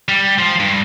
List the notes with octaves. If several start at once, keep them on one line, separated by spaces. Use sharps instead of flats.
G3
F3
G2